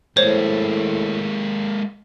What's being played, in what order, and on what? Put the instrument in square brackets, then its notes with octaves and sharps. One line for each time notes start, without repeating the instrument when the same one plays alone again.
[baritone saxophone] A2 [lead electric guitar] G#3 A#3 [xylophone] C5 C#5